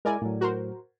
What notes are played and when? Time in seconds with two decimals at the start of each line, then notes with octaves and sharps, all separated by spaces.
0.05 G#3 E4 A#4 D5 G#5
0.22 A2 F#3
0.41 F#4 A#4 C5